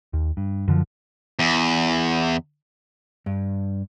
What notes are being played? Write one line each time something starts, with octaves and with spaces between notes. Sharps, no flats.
D#2
G2
F#2 D3 E3 F3
E2
G2